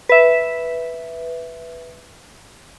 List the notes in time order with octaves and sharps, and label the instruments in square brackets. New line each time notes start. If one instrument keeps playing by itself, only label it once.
[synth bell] B4 E5